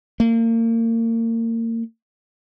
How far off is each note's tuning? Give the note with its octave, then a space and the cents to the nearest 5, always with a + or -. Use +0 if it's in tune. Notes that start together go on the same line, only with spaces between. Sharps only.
A#3 -35